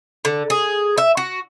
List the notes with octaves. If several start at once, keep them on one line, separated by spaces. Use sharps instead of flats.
D3
G#4
E5
F#4